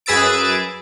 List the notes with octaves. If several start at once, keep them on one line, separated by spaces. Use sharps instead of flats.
F#2 G#4 B4 E6 A6 D7